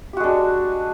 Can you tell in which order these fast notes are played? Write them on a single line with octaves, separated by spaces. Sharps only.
G4 F#4 G#3 D4